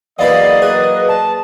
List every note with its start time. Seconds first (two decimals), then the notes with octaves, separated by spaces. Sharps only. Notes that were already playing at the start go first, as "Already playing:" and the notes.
0.19 E2 F#3 A#3 E4 B4 D5 D#5 F5
0.62 G#4 B4
1.09 A5